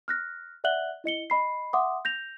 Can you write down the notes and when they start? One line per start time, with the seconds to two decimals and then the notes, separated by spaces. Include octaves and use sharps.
0.08 F6 F#6 A#6
0.64 D5 E5 F#5 F#6 F#7 G7
1.04 E4 D#5 C#7 G7
1.30 D#5 B5 C7
1.73 E5 F#5 C6 D6 D#6
2.05 G6 A#6 F7